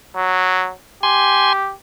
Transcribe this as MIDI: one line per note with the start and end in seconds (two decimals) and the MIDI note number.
0.16 0.72 54
1.03 1.73 67
1.03 1.53 80
1.03 1.53 84